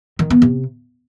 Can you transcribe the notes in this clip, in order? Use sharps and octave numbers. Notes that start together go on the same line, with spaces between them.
D#3
B3
C3